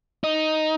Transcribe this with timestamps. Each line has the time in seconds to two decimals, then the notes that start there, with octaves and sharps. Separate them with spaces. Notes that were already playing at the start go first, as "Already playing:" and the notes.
0.24 D#4